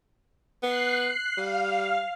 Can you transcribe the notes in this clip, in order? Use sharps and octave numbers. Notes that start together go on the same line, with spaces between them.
B3 F#6 C7
G3 F5